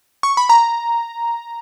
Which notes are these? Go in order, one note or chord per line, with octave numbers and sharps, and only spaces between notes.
C#6
B5
A#5